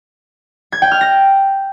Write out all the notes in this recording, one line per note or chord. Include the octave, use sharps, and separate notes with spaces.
G#6
G5
F6
A#6